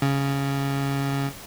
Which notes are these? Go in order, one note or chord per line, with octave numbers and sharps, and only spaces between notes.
C#3